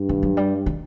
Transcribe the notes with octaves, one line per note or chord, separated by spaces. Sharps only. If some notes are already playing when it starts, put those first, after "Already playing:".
Already playing: G2
D#3
F#3
G3
D#3